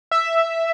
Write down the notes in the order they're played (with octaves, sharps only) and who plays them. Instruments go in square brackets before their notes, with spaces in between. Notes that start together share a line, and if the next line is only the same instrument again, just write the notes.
[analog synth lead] E5